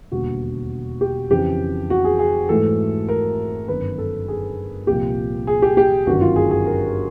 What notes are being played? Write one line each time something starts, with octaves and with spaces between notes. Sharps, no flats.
E1 D#2 D3 G3 F#4
G4
F2 C#3 E3 G4
F#4
G#4
G#4
G#2 E3 A3 A4
A#4
G1 F#2 D#3 B4
A4
G#4
C2 A#2 F3 G4
G#4
G4
G4
G1 F#2 D#3 F#4
F4
G#4
G#4
A#4